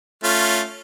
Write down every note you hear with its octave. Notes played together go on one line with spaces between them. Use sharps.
A3 C#4 F4